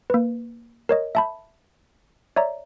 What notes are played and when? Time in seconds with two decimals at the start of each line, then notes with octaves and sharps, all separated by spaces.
0.10 A#3 B4
0.89 A#4 C#5 D#5
1.15 E5 A5 B5
2.36 C#5 D5 E5 A#5